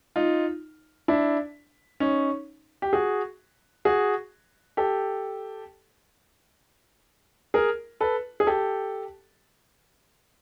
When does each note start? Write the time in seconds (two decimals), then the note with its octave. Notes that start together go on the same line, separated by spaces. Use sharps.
0.16 D#4 F4
1.08 D4 E4
2.00 C#4 D#4
2.82 G4
2.93 F#4 G#4
3.85 F#4 G#4
4.77 G4 A4
7.54 G#4 A#4
8.01 A4 B4
8.40 G#4
8.47 G4 A4